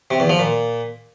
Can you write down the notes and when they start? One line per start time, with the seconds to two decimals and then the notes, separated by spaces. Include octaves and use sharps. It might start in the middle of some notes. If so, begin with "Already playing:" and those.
0.11 C3
0.20 E2
0.29 F3
0.39 A#2